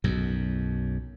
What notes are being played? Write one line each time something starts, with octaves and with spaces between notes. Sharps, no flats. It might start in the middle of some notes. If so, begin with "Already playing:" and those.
B1 F#2